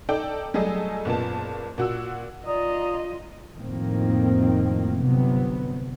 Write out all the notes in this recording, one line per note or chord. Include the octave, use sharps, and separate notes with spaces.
D#4 A4 D5 G5
F#3 G3 A3 G#4 A4 D#5
F#1 A#2 B3 A5
A#2 F#4 E6
F4 D5 D#5 A#5 D#6
F2 A2 D#3 A#3 C4
G1 G2 C3 F#3 B3